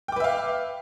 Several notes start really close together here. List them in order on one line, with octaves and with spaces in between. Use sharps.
G5 D6 B4 E5 F5